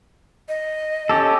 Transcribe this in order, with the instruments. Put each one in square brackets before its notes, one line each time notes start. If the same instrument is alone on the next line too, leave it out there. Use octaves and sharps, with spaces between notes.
[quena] D#5
[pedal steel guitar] C#4 G4 A4